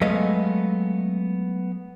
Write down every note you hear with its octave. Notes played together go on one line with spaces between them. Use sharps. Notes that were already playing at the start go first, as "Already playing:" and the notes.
F#3 G#3 A3 B3 D#5 F5